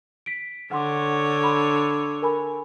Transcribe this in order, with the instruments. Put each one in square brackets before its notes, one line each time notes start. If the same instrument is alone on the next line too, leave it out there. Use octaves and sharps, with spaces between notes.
[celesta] B6 D7
[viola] D3 C#5 [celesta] F#5 C6 D6
[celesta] B5 C6
A#4 G#5 B5